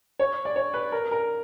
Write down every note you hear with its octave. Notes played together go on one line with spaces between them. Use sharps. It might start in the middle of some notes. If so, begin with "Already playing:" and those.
C#5
D5
C#5
B4
A#4
A#4